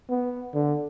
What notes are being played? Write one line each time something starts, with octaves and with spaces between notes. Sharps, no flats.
B3
D3